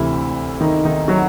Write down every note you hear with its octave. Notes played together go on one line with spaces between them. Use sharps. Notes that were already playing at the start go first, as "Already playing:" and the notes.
Already playing: D2 C3 E3 E4
D#3 D#4
D#3 D#4
F#3 F#4